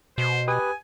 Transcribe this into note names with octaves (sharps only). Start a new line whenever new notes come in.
B2 C5
G4 B4 G#5 D#6